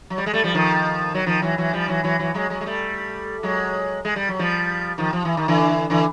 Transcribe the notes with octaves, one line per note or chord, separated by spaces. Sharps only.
F#3
G3
G#3
G3 A3
F3 G3
D#3 F3
F#3
D#3 F3
E3 F#3
E3 F#3
F3 G3
E3 F#3
E3 F#3
E3 F#3
F#3 G#3
F#3 G#3
G#3
G3 A3
F#3 G#3
G#3
G3
F#3
F3 G3
D#3 F3
F3
E3
D#3
D3 E3
D3 E3